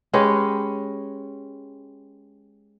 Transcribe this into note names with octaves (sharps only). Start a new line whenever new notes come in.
G#3 C#4 G4 B4